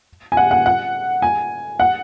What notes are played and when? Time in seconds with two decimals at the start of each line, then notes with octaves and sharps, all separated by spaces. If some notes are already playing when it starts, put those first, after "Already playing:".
0.32 G#5
0.37 F#5
0.51 F#5
0.66 F#5
1.22 G#5
1.80 F#5